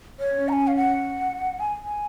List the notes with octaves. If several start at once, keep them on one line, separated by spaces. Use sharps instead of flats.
C#5
C#4
A#5
G#5
F5
F#5
G#5
G#5